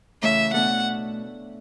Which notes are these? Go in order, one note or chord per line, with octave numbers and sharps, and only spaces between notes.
C#3 E3 A3 E5
B2 A3 D4 A4 F#5